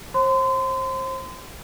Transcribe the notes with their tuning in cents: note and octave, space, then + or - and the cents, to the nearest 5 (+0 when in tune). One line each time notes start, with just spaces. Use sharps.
C5 +35 C6 -35